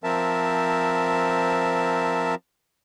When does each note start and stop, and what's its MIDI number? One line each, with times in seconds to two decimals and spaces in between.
0.04 2.35 53
0.04 2.35 60
0.04 2.35 70
0.04 2.35 76
0.04 2.35 81